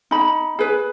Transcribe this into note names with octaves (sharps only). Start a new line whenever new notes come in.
D#4 B5
G#4 B4